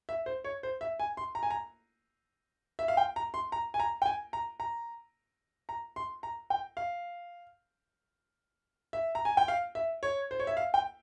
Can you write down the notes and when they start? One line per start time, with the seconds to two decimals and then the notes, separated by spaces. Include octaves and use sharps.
0.09 E5
0.26 C5
0.44 C#5
0.63 C5
0.81 E5
1.00 G#5
1.17 C6
1.35 A#5
1.43 G#5
1.50 A#5
2.79 E5
2.88 F5
2.97 G5
3.16 A#5
3.34 C6
3.52 A#5
3.74 G#5
3.80 A#5
4.02 G5
4.06 G#5
4.33 A#5
4.60 A#5
5.69 A#5
5.96 C6
6.23 A#5
6.50 G5
6.77 F5
8.93 E5
9.15 A#5
9.25 G#5
9.37 G5
9.48 F5
9.75 E5
10.03 C#5
10.31 C5
10.39 C#5
10.47 E5
10.57 F5
10.74 G5